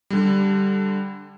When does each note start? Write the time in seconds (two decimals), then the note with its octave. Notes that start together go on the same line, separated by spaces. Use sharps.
0.10 D3 G3